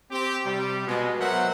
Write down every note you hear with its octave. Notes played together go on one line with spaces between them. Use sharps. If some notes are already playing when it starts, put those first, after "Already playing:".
C4 G4
C3 G3
B2 G#3
F#3 B3 A#4 C5 E5 F#5